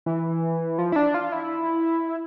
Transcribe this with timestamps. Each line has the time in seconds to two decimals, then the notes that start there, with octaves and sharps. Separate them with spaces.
0.06 E3
0.78 F3
0.92 E4
0.96 D4
1.14 F4
1.32 E4